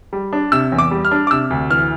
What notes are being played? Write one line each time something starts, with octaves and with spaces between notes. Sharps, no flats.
G3
D4
C3 E6
E2
D6
G3
F6
D4
D6
C3 E6
D2
E3 F6